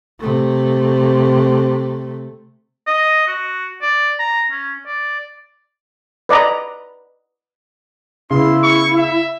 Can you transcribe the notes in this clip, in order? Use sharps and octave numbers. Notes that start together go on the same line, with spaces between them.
C3 A3
D#5
F#4
D5
A#5
C#4
D5
B4 D5 D#5 A#5
C#3 B3 E4 C6
C#6
E5